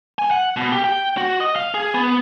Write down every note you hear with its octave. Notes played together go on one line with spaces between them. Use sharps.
G#5
F#5
B2
G4
G5
F#4
D#5
F5
G#4
B3